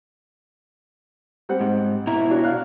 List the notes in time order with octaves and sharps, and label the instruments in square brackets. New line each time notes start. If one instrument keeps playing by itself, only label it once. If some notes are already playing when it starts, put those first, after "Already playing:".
[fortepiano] G3 C4 F#5
[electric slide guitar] G#2
B2 E4 A#5
[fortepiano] D4 F#4 C#5
F5 F#6